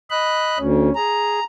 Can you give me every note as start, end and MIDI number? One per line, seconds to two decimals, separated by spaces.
0.10 0.58 75
0.10 0.58 83
0.10 0.58 90
0.59 0.90 38
0.59 0.93 61
0.96 1.40 68
0.96 1.44 82